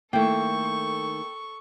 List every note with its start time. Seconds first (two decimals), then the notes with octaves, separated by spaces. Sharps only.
0.13 D#3 A3 A#3 E4 A4 G5 C#6